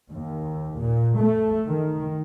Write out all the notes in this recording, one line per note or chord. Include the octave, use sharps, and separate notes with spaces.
D#2
A#2
A3
D#3